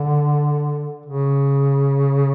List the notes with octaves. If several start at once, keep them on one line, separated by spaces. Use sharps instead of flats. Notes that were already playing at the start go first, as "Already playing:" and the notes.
Already playing: D3
C#3